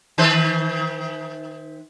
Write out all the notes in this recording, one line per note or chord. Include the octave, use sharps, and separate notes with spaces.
D#3 B4 C5